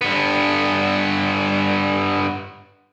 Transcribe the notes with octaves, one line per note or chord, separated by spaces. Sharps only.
G2 B3